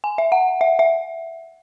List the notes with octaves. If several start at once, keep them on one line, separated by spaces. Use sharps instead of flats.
G#5
E5
F#5
E5
E5